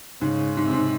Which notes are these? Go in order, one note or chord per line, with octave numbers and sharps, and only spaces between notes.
G#2 C#3
G#2
C3
G#2